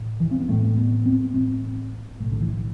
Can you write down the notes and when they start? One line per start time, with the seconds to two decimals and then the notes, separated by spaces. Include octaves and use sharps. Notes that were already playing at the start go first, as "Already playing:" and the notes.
Already playing: A1 A2
0.20 E3
0.31 C4
0.40 B3
0.49 A1 A2 A3
0.77 B3
1.06 C4
1.34 A1 A2 C4
2.20 B1 A2 A3
2.32 D3
2.41 E3